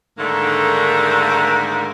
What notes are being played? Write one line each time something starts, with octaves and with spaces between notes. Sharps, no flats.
G#2 D3 D#3 A3 A#3